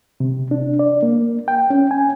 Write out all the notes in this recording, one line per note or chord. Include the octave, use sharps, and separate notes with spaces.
C3
D4
D5
A#3
G5
C#4
G#5